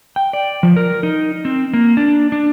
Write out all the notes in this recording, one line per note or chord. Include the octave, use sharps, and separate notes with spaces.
G5
D5
F3
A#4
D#4
C4
A#3
D4
D4